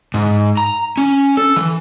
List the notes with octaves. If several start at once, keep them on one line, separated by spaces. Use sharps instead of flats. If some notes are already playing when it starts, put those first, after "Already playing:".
G#2
A#5
C#4
A4
E3